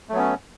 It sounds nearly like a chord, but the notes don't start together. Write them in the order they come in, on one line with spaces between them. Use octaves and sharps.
A3 F#3 B3 C#4